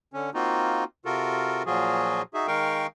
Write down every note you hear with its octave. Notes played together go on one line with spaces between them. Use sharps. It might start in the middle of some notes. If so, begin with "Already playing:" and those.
D3 C#4
A#3 C4 D#4 F4 F#4
C3 F4 F#4 A4 A#4
A#2 F3 F#3 F4 F#4 G#4
D#4 F#4 G#4 E5
D#3 G#3 A#4 F5 G5 C#6